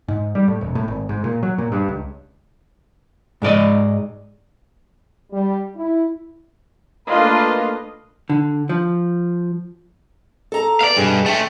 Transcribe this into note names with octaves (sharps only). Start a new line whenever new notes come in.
G#2
G3
A2
E1
A2
G#1
G#2
A#2
F#3
A#2
G2
C#2
G#2 G#3 D5 D#5
G3
E4
A3 A#3 D4 F4 B4 D#5
D3
F3
A4 A#5
B3 D5 F5
G2 B2 G#4 D#5
A3 C#4 G5